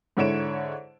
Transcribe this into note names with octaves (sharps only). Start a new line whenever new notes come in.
G#2 D3 E4 C#5 D7 E7